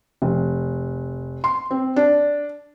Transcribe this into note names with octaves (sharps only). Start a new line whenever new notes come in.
F1
C6
C4
D4